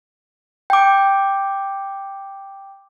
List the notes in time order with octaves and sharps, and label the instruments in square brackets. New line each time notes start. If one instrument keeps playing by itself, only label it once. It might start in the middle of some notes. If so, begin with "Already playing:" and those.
[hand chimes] G5 D6